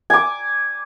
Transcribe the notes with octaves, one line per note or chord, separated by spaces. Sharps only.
G#5 D6